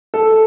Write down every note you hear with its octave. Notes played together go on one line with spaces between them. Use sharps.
A4